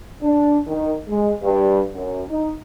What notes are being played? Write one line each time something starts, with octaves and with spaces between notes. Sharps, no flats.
D4
D#3
G#3
G2
F#2
D#4